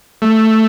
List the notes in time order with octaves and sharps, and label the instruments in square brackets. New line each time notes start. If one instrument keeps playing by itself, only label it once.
[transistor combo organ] A3